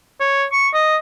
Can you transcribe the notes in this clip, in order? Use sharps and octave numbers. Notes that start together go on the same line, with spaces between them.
C#5
C#6
D#5